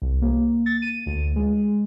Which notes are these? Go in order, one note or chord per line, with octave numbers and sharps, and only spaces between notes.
C2
A#3
A6
D#7
D2
G#3